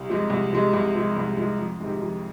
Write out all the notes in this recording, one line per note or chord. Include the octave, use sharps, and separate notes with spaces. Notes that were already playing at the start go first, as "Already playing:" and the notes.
Already playing: C2
C3 F3 G#3
C2
C3 F3 G#3
C2
C3 F3 G#3
C2
C3 F3 G#3
F2
C3 D#3 G#3
F2